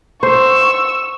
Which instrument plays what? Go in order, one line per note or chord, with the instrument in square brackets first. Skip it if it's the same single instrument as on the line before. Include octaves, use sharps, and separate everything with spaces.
[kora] C5 [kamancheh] C#6 E6